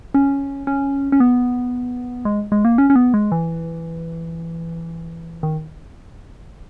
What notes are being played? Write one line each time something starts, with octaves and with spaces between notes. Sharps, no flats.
C#4
C#4
C#4
B3
G#3
G#3
A#3
C#4
C#4
B3
G#3
E3
D#3